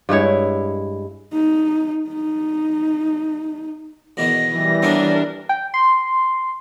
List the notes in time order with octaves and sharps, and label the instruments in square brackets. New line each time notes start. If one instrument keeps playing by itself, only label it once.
[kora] G2 G#3 E4 C#5
[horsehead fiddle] D#4
D#4
[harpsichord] E2 B2 D#3 [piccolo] A#6
[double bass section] E3 G3
[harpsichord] B3 C#4 [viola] D4 A#4
[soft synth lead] G5
C6